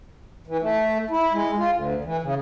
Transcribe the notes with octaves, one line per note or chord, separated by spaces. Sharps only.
E3
A3
E4
G#3
F4
D2
E3
C#3